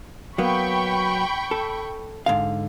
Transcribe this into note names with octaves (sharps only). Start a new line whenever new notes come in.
F#3 A#3 B3 G5 B5 C#6
A4
G#2 D3 F5